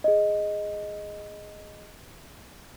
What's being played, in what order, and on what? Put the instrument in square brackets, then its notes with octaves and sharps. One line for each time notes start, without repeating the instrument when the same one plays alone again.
[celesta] G#4 D#5